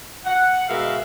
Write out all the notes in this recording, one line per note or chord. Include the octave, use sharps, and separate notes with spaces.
F#5
B2 G#3 F#4 A#4 E5 F5